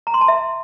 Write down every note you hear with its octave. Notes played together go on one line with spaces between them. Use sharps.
A#5
C6
A5
E5